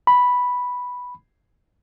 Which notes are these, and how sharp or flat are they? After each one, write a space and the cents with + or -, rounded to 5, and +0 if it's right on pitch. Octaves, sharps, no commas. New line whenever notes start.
B5 -5